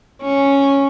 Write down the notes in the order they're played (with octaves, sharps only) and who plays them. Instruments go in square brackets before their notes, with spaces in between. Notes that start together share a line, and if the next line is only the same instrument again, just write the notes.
[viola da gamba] C#4